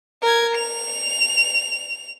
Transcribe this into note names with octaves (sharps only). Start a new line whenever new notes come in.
A#4 G#6
F7